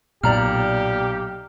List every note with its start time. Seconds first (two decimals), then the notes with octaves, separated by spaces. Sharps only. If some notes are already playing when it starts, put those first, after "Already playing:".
0.23 B1 A#2 G4 D5 A#5 F6